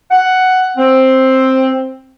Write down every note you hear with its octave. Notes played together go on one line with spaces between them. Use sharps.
F#5
C4